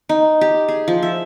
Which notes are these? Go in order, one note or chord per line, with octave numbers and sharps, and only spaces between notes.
D#4
G4
G#4
F3
E5